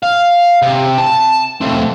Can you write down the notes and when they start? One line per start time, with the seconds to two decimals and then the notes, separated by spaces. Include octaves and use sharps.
0.03 F5
0.62 C3
0.98 A5
1.61 A3 C4